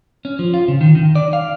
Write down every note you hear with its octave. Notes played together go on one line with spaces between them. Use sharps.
C#4
F3
F4
C#3
D#3
D#3
D5
F5